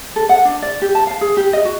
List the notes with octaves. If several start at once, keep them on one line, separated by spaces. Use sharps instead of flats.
A4
F#5
D4
D5
G4
A5
F5
G#4
G4
D#5
F#4